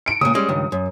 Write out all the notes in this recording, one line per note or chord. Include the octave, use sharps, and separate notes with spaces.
C#7 D7
C#2 A#2 D#6
G3 G#3 C#4
C#2 G2 D#3
F#2